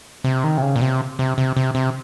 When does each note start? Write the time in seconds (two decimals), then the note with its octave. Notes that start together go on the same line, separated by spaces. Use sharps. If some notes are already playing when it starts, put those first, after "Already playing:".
0.24 C3
0.44 D#3
0.58 C3
0.62 C#3
0.76 A#2
0.81 C3
1.19 C3
1.38 C3
1.57 C3
1.75 C3